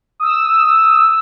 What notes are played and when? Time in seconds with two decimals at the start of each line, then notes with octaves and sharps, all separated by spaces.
0.20 D#6 E6